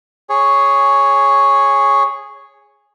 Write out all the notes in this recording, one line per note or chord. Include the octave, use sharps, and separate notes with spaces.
G#4 C#5